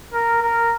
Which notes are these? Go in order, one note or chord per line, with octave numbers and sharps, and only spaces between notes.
A#4
A#4